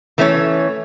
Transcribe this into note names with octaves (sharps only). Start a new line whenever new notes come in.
E3 A3 C#4 D#4 C#5